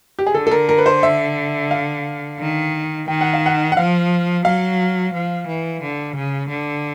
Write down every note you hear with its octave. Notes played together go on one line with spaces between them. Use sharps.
G4
G#4
D3 A4
A4
A#4
A#4
B4
C5
E5
F5
D#3
D#3 G5
F#5
F5
F#5
F#5
F3 F5
F#3 F5
F3
E3
D3
C#3
D3